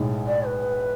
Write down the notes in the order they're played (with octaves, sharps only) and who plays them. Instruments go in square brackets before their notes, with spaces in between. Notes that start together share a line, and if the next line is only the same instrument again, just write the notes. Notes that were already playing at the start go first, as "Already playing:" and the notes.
Already playing: [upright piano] B1 A2 G#3
[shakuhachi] D5
B4